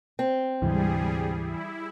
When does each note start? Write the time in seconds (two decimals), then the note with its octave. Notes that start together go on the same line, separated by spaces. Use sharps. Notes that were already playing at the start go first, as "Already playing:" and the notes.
0.19 C4
0.62 D2 G#2 C3 E3 G3 G#4
1.41 E4